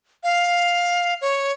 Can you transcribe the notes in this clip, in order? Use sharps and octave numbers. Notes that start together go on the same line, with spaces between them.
F5
C#5